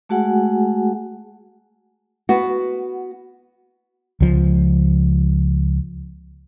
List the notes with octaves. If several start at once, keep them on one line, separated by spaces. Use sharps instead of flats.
G#3 A3 F#4 G#4 F#5 G#5
B3 F#4
C#2 F3